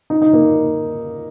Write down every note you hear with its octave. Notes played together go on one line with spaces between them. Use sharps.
D#4
D#4
A#3